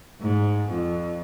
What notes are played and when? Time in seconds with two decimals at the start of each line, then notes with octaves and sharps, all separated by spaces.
0.21 G#2
0.68 F2